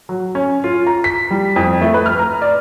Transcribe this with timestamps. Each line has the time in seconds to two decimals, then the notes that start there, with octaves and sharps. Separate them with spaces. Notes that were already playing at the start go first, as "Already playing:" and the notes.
0.09 F#3
0.35 C#4
0.64 F4
0.87 A#5
1.04 B6
1.31 G3
1.56 F2
1.81 A3
1.94 B4
2.06 F6
2.19 A#5
2.42 D5